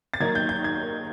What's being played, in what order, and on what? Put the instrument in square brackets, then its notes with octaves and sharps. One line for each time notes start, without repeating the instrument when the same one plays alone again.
[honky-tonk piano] A6
D#3 F#3 A#3 D#4 G#6
G6
G6
G#6